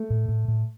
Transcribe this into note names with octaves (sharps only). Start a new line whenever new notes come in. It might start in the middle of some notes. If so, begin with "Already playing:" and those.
Already playing: A3
A2
A2
A2